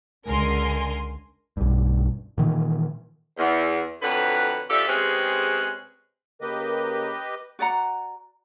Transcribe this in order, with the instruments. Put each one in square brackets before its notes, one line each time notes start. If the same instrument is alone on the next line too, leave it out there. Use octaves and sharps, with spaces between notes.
[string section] C#2 D3 A#4 G#5 C6
[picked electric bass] B1 G2
A#2 D#3 E3
[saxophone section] E2
F2 D3 F#3 B4
F3 D4 G4 A4 E5
C3 G#3 C4 C#4 G#4 B4
[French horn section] C#3 A#3 A#4 [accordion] G4 B4 D#5
[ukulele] F#4 D5 F#5 A#5